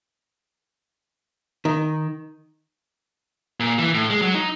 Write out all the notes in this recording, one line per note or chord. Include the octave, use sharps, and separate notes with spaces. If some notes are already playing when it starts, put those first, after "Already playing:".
D#3
A#2
E3
A2
G#3
F#3
D#4